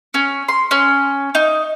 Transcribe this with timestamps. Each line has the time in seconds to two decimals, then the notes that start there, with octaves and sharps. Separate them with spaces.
0.14 C#4
0.48 C6
0.71 C#4
1.35 D#4